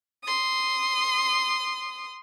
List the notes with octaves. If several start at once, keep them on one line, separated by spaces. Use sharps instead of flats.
C6 D#6